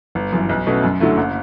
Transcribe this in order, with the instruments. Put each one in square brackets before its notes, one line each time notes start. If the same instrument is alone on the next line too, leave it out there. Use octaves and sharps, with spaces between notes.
[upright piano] G1
F#2 E3
B1
B2 A3 C#4
F#2
D3 F#3 A3 E4
F#1